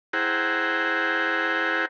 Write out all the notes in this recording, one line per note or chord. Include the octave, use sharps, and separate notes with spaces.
E4 G#4 C5 F#5 G5 A#5